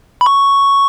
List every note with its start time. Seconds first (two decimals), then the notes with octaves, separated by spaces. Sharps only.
0.21 B5
0.26 C#6